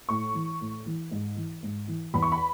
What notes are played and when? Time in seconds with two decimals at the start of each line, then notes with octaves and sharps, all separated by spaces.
0.09 A2 C#6
0.34 E3
0.61 A2
0.86 E3
1.11 G#2
1.36 E3
1.63 G#2
1.88 E3
2.14 E2 B5
2.22 C#6
2.32 B5